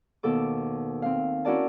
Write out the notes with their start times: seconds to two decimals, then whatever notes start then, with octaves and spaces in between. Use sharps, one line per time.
0.23 D#2 B2 A4 D6
1.02 C4 F5
1.45 C#4 E4 F#4 A#4 D5 A5